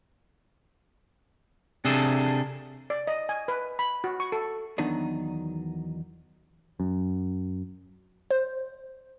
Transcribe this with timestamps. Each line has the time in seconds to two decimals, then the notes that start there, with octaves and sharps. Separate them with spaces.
1.85 C3 D4 G#4 A4
2.90 D5
3.07 D#5
3.29 G#5
3.48 B4
3.79 B5
4.04 F#4
4.20 C#6
4.32 A4
4.78 E2 D#3 F#3 B3 D4 D#4
6.80 F#2
8.31 C5